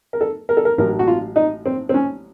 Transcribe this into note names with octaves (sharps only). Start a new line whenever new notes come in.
A#4
A4
A#4
A4
A#4
A1 A2 F#3 A#4
F#4
F4
D#4
C4
C4
C#4